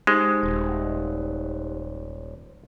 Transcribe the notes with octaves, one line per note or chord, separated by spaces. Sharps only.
G#3 D#4 G4 C5
D#1